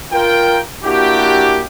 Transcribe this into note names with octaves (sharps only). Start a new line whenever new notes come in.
F4 A#4 G5
A#3 D4 E4 F#4 G4